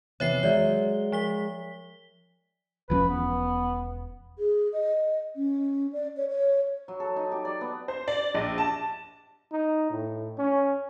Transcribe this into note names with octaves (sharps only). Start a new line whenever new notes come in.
C3 E3 B3 C#5 E5 C7
F#3 G#3 C#5 D5 E5 G7
F3 B6 G7
E1 F3 C#4 B4
B3
G#4
D#5
C#4
D5
C#5
C#5
F#3
A4
D#4
G4
D5
B3
C5
D5
A#1
A5
D#4
A2
C#4